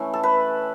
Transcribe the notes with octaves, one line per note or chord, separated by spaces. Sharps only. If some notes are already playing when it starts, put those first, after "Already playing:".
Already playing: E3 A3 C#4
A4
B4